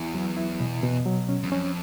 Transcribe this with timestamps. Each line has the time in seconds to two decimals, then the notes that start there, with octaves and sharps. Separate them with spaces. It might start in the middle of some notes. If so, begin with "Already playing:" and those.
Already playing: E2 E4
0.14 F#3
0.37 E4
0.60 B2
0.83 B2
1.06 F#3
1.29 C#4
1.43 E2
1.52 F2 C#4